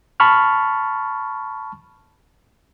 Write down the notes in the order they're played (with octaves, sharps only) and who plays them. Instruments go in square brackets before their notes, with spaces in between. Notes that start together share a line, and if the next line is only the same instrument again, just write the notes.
[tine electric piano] A5 B5 C#6 F6